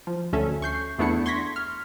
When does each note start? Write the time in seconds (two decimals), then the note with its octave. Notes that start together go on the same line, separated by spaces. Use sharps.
0.07 F3
0.33 D2 C#4 A4 E5
0.62 C#6 G6 C7
0.99 E2 A3 B3 D4 E4 C#7
1.26 C6 C#6 G#6 A#6 B6
1.56 F6